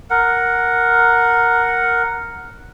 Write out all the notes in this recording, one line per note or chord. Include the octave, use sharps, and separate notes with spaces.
A#4 F#5